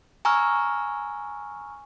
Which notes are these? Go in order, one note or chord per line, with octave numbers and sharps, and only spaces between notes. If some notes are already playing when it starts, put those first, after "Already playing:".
G#5 A#5 C#6 E6 F6